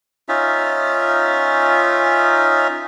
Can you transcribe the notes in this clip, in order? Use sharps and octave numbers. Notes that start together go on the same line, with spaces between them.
C#4 D#4 F4 E5